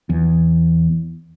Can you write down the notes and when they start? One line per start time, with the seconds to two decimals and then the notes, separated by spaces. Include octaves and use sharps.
0.09 E2